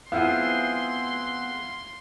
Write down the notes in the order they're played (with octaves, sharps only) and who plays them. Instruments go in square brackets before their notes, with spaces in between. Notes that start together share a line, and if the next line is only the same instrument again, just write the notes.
[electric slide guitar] B3 C4 G#4 [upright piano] E4 F4 F#5 [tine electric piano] F5 [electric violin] C6